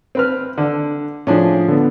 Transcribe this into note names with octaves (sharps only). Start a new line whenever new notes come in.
C4 B4 F6
D3
A2 F3 C#4 D4 G#4
D3 B3